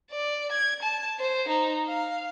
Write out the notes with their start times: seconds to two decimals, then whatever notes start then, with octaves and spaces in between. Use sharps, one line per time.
0.11 D5
0.52 G#6
0.82 A5
1.20 C5
1.48 D#4
1.88 F5